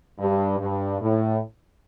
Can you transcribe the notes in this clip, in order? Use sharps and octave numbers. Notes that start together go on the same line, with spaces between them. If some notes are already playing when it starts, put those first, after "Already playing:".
G2
G2
A2